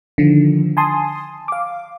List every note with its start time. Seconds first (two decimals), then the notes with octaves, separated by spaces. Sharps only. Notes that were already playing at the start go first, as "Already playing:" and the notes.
0.18 D3 D#3 F3
0.77 G#5 A5 C6 D#6
1.48 F5 D6